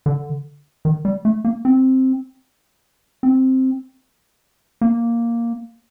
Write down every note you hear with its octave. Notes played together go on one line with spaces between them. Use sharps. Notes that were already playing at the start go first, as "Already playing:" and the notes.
D3
D#3
G3
A3
A#3
C4
C4
A#3